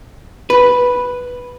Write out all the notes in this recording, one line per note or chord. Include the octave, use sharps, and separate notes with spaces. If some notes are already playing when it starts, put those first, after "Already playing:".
B4